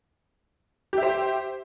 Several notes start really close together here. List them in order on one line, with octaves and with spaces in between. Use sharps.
G4 E5 C5